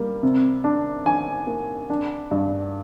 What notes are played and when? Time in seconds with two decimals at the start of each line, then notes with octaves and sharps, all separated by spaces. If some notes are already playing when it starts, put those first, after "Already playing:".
Already playing: G3 A#3
0.23 C3
0.64 D4
1.05 D4 G#5
1.47 A#3
1.90 D4
2.31 G2